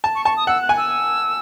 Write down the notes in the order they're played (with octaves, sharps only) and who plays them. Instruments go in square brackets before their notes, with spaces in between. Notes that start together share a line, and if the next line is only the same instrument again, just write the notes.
[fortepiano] A5
[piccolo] C#6
[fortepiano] A5 [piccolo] C#6
[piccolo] D#6
[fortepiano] F#5 [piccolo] E6
[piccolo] F#6
[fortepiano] G#5
[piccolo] E6